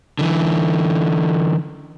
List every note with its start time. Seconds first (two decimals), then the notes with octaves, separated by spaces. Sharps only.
0.19 D3 E3